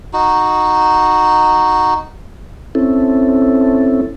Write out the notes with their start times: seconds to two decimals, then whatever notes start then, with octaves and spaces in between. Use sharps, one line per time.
0.13 D#4 F#4
2.75 C4 C#4 E4 A4